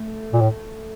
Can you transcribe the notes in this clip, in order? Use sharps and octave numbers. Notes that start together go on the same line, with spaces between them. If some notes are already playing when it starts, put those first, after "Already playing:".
Already playing: A3
A#2
A2